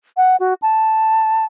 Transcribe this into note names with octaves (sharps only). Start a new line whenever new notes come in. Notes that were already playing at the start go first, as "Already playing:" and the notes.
F#5
F#4
A5